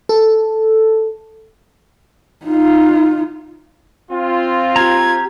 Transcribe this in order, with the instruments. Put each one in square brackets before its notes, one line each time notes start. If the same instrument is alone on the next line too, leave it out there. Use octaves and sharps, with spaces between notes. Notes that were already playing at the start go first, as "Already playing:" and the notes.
[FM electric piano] A4
[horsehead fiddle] D#4 F4
[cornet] C4 [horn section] F4
[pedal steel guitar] G4 A#5 [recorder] G#6